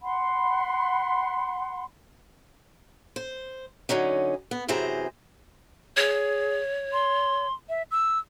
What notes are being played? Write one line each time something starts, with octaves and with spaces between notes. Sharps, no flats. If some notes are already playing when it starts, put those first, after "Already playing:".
F#5 B5 C6
C5
D3 F#3 C#4 D#4
B3
F#2 C3 E3 G#4 C5 A#5
G#4 C#5
C6
E5
E6